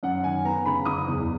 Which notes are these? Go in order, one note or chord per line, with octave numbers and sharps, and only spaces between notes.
F#2 F#5
D#3 G#5
B3 A#5
C#3 B5
F#1 D#6
E2